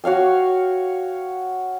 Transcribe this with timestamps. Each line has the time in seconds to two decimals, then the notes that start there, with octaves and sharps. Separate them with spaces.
0.04 F#4 C#5 F5 G5